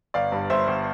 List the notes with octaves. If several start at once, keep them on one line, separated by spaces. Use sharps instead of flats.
G1 D5 F5
G2
G1 C5 E5
G1